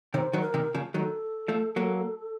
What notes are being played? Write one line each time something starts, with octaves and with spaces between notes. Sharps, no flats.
C3 D#3 C#5
C5
D#3 F#3
A#4
C3 D#3
C#3 F3
D#3 F#3 A4
F3 A3
F#3 A#3